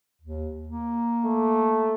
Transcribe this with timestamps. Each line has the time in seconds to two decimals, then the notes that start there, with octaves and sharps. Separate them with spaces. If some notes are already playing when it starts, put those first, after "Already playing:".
0.22 D#2
0.69 A#3
1.25 A3